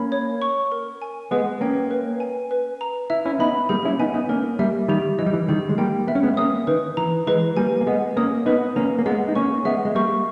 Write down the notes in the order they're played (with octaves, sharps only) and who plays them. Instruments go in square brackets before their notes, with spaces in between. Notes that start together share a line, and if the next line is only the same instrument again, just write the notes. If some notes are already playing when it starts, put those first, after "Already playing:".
Already playing: [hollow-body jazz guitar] A#3 C#4 [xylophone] B5
[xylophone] C#5
C#6
A#4
G#5
[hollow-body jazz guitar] G#3 B3 [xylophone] B4
[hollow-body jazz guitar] A#3 C#4 [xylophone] G5
[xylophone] B4
G#5
B4
A#5
[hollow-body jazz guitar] E4 [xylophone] E5
[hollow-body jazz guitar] C#4 E4
[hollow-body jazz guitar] B3 D#4 [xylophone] B5
[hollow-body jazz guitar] G3 A#3 [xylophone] G#4
[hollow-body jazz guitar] C#4 E4
[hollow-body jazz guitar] B3 D#4 [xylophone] G#5
[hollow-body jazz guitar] B3 D#4
[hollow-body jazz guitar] A#3 C#4 [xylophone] A#4
[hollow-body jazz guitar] G3 A#3 [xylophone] E5
[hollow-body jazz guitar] D#3 G3 [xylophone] G4
[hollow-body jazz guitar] E3 [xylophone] D#5
[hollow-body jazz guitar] G3
E3
[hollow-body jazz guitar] D#3 G3 [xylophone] G#4
[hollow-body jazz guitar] G#3
[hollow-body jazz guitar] G3 A#3 [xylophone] G5
[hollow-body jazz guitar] B3 [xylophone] E5
[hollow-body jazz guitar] C#4
G#3 B3
[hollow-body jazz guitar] A#3 C#4 [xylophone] D#6
[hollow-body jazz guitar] D#3 [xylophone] B4
[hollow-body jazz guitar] E3 [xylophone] A#5
[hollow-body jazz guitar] E3 G#3 [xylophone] B4
[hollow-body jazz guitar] G3 A#3 [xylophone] G#5
[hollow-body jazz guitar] A#3
[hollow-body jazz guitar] G#3 B3 [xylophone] D#5
[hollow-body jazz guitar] A#3 C#4 [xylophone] D#6
[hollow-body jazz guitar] B3 D#4 [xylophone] B4
[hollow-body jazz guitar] A#3 C#4 [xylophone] A#5
[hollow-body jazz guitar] A#3
[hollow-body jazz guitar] G#3 B3 [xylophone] D#5
[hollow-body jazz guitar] D#4
[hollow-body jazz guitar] A#3 C#4 [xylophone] C#6
[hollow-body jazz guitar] G#3 B3 [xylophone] E5
[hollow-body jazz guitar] G#3
[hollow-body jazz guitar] G3 A#3 [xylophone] C#6